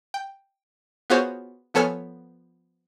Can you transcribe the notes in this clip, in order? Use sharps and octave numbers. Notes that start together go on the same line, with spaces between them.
G5
B3 F4 F#4 G#4 C5 C#5
F3 B3 A4 C#5 G#5 F6